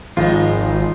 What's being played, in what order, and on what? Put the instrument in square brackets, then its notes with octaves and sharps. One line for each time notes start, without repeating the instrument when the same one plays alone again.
[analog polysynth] G#1 [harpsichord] F3 G#3 [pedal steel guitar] D#4 F4